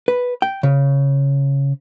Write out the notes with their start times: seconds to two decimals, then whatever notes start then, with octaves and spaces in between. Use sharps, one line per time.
0.08 B4
0.42 G5
0.63 C#3